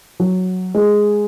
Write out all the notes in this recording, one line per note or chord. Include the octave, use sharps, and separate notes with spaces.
F#3
G#3